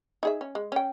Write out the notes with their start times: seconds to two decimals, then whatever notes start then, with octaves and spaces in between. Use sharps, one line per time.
0.23 D#4 G#4 E5
0.41 C#4
0.55 G#3
0.72 C#4 G5